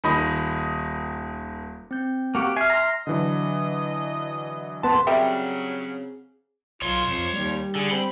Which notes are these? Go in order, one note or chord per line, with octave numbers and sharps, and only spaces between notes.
D#1 D#3 D#5 B5
C4 G6
A#3 F#4 G4
E5 G#5 F6 C7
A#5 C6 F6 A#6
D3 E3 F#3 D#5
B3 A5 C6
C#3 F#3 G3 C4 G#4 A#4 E5 G5
B1 F4 C#5 C6
F2 F3
D#2 G3
D3 G#4
C4 B5